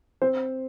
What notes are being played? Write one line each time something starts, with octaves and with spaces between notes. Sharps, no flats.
C4 C5